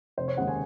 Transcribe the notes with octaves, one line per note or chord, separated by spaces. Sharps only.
F1 C5
C#5
D#2 C#3 G#3 F#5
G#5